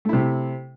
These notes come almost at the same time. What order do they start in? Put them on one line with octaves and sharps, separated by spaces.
A3 E4 C3